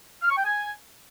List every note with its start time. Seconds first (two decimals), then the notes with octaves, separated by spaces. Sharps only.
0.23 F6
0.30 C#6
0.37 G5
0.45 G#5